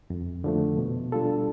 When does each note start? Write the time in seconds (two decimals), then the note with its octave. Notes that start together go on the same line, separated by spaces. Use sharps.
0.10 F2
0.44 D3 F3 A3
0.77 B2
1.12 G3 D4 F4 A4